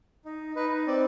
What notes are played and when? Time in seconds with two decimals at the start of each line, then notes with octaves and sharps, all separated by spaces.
0.25 D#4
0.56 D#4 B4
0.87 C4 D5